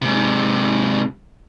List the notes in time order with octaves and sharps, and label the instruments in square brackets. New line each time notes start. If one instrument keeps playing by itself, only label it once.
[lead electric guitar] G#2 C3